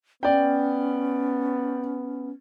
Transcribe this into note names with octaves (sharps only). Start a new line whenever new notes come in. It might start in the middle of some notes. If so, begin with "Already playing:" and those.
B3 C#4 D5 G5